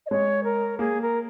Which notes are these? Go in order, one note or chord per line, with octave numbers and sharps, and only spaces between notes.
D#5
G#3 C#5
A#4
A#3 G#4
A#4